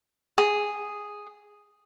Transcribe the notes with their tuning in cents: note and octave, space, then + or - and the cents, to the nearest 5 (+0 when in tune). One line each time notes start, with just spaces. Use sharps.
G#4 -5